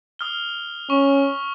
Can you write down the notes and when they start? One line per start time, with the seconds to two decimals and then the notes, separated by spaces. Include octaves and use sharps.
0.19 D#6 F6 G7
0.90 C#4 C#6